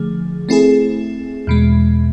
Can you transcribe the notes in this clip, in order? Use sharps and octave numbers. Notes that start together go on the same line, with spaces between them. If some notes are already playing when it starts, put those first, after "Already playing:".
Already playing: D3 F3 A3 G#4
A3 C4 E4 G#4
E2 B2 G#3